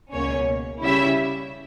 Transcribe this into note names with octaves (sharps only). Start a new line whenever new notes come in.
C#2 B2 A#3 C#4 C#5
C#3 G3 C#4 E4 E5